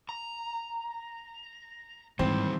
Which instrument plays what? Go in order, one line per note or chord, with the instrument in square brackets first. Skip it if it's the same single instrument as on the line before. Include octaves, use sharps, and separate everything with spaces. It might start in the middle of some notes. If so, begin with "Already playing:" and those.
[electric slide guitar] A#5
[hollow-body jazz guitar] G#2 [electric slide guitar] D#3 G3 [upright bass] E3 [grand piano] C4